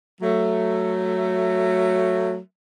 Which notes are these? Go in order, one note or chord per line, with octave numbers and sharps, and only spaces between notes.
F#3 A3